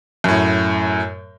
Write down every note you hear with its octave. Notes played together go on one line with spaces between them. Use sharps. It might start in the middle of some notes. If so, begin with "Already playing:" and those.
F#2 A2